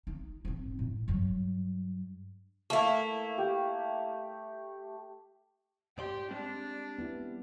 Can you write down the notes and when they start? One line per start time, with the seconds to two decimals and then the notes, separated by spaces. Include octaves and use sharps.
0.07 D#4
0.45 G#2 C4
0.79 A2
1.08 G2 F#3
2.70 A3 A#3 E4
3.38 G4
5.98 G#2 G4 D5 C6
6.31 G3 G#3 C4 D4
6.98 B3 E4